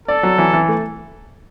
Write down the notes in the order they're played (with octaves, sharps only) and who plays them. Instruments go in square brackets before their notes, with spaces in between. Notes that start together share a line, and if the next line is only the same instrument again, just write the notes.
[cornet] A4 [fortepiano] D5
[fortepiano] F#3
E3
E3
A3